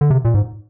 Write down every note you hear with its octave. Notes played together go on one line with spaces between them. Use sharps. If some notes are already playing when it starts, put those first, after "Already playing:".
D3
C3
A#2
G#2